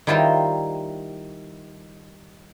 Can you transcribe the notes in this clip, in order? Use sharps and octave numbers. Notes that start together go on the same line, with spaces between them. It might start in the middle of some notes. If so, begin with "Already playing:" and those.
D#3 G3 E4 F4 A#4 C5